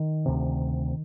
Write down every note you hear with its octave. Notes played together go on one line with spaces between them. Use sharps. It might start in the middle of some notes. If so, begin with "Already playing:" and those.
Already playing: D#3
D2 C3